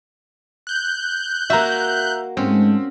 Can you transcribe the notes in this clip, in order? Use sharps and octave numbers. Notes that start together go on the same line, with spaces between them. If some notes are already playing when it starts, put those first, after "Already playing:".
F#6 G6
A#3 F#4 E5 A#5
G#2 G#3 A3 C4 C#4